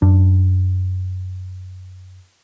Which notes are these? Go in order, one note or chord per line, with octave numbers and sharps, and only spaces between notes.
F#2 D4